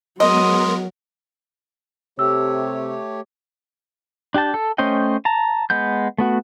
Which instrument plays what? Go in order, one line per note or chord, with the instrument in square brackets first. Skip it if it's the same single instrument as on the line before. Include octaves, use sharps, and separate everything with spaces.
[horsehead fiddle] F#3 [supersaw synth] G#3 B3 A#4 [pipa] D#5 [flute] C6
[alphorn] C3 [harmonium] A3 G4 C#5 [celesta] E6
[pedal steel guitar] D4 G4 G5 A5
A4
A3 C#4 C5 D#5 G5
A5 A#5
G#3 B3 G6
A3 B3 F#4